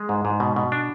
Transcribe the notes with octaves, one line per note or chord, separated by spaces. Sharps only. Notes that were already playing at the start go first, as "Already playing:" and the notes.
Already playing: G#3
G#2
G#2
B2
B2
D4